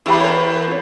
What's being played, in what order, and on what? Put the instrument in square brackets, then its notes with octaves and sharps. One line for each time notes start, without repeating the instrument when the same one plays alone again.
[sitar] E2 [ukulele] E4 G4 B5
[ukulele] A#4 C5 C#5
F4 C#5